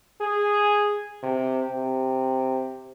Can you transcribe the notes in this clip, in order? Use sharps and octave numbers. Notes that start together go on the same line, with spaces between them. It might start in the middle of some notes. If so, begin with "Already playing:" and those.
G#4
C3
C3